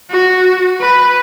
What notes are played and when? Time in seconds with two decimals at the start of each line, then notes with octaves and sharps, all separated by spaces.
0.11 F#4
0.81 B4